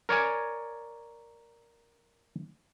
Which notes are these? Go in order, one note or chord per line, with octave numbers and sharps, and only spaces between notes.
A#4 C#5 D5 G#5